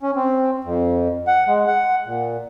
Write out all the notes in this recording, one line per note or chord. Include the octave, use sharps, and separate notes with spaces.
C#4
C4
F2
F#5
G#3
F#5
A#2